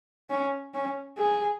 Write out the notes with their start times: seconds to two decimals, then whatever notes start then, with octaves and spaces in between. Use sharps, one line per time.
0.30 C#4
0.74 C#4
1.18 G#4